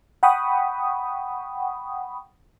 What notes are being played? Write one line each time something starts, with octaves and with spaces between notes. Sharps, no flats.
F#5 G5 B5 C#6 D#6